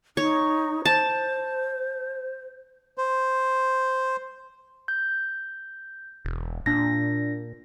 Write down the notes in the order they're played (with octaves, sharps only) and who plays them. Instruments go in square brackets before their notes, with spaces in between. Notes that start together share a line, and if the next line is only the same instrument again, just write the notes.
[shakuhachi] D#4 [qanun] C#5
[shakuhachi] C5 [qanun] A5
[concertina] C5
[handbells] G6
[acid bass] E1
[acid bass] A#2 [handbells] D4 A#6